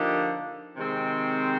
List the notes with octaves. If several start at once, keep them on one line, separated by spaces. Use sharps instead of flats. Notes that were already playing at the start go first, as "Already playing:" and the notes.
Already playing: D3 F3 A#3 D#4 G4
C3 D#3 G#3 C4